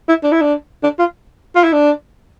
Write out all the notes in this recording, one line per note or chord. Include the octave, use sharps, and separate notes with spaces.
E4
D4
E4
D4
D4
F4
F4
E4
D4